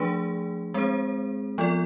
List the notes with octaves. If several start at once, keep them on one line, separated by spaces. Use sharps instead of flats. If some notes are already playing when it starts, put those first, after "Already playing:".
Already playing: F3 A3 D4 G#4 B4
G#3 C4 G#4 C5
F3 B3 F4 A4 D5